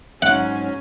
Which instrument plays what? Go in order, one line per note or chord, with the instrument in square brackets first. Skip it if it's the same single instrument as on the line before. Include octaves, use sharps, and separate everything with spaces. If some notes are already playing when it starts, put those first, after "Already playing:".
[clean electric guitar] G#2 F#3 [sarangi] C#4 [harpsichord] F#5